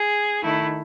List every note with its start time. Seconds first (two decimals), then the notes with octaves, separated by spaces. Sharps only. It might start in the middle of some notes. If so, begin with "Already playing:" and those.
Already playing: G#4
0.43 D#3 A3 E4